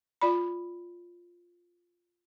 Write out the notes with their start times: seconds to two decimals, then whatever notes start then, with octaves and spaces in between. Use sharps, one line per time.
0.21 F4 D5 B5